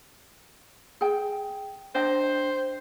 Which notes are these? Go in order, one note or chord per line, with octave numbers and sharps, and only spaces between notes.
G#4 G5
D4 C5 D#5 G5